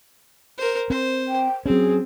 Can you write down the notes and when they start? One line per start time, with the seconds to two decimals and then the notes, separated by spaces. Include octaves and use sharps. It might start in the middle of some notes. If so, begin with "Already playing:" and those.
0.58 A#4 C5
0.90 C4 C5
1.28 G5
1.66 F#3 C4 C#4 G#4